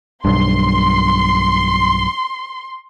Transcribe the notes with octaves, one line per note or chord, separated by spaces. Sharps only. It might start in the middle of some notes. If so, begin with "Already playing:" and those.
B1 G2 C6